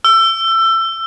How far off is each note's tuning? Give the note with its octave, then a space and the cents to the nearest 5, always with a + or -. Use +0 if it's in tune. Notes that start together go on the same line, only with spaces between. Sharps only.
E6 +25